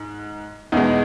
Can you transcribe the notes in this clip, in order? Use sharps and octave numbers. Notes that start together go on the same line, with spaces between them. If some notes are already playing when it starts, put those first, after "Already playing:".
Already playing: G#2
E2 B2 G#3 D#4